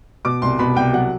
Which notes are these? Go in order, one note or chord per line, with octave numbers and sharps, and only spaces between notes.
B2 D6
C2 C6
B2 B5
C2 G5
F#3 F#5